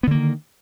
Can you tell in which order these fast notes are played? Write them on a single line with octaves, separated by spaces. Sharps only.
B3 D3 A#3 D#3